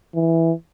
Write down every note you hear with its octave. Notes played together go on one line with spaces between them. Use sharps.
E3